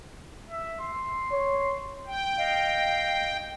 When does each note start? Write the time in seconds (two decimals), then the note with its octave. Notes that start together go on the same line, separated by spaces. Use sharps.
0.50 E5
0.80 C6
1.32 C#5
2.07 G5
2.37 D#5 F5